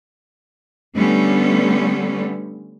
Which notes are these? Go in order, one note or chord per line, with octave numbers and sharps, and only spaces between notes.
D3 G3 A3 B3 C#4